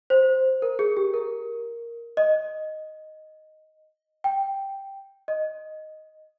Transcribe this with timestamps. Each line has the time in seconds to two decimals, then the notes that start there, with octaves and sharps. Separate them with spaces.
0.10 C5
0.62 A#4
0.79 G#4
0.97 G4
1.14 A#4
2.17 D#5
4.24 G5
5.28 D#5